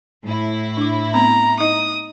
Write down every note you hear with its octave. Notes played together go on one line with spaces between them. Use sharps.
A2 E4
D4 D6
A3 B3 C4 A#5
D#4 D#5 D#6